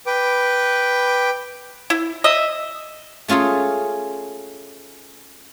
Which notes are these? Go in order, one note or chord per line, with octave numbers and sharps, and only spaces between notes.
B4 G5 D6
E4
D#5 E5
A3 C#4 F4 G#4 A4